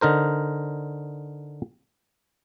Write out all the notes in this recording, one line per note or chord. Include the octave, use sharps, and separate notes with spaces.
D3 D#4 A#4 C5